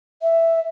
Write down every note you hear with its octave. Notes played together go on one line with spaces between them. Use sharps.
E5